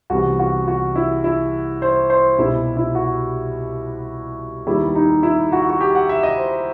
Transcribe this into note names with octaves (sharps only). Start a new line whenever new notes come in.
C2 C3 E3 B3 F#4
F#4
F#4
E4
E4
C5
C5
C2 B2 G3 B3 E4
E4
F#4
D#2 D#3 G3 B3 E4
D#4
E4
F#4
F#4
G4
F#5
E5
D#5
C5